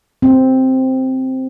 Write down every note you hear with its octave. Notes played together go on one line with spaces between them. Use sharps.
C4